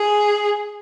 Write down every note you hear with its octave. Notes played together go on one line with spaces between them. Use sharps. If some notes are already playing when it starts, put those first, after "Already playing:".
Already playing: G#4